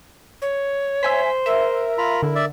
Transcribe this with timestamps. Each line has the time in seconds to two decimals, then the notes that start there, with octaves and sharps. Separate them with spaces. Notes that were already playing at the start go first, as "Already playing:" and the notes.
0.42 C#5
1.03 C5 E5 G#5 B6
1.46 A#4 E5
1.98 F4 A#5 B5
2.23 D3 E4
2.35 D5 E5